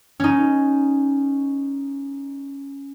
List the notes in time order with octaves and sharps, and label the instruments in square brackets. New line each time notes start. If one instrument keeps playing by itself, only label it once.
[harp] C#4 D#4